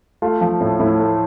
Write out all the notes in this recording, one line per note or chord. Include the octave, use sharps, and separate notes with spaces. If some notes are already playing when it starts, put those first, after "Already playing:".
A3 F4
F3
A2
A2 E4
A3